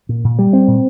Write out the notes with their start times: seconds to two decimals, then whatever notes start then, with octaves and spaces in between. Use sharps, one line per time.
0.09 A#2
0.24 A#2
0.39 G3
0.53 C4
0.68 A#2